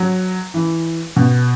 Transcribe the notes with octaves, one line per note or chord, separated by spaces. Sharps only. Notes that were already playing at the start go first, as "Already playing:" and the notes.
Already playing: F#3
E3
B2